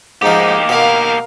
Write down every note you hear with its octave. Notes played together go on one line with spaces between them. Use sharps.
G#2 F3 A#3 D#4 G4
B2 A#4 F5